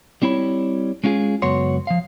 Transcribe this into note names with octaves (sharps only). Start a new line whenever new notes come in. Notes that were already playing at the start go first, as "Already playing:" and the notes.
G3 C4 E4 C#5 B5
G#3 C#4 F4 F#4 G#4
C#2 F#2 B3 F#4 C#5 C6
F3 F5